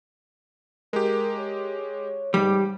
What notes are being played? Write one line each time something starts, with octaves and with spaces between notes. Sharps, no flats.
G#3 G4 A#4
C#5
G#2 G3 D6